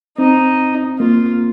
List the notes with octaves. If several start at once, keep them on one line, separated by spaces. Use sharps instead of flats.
C4 D#4
A#3 F4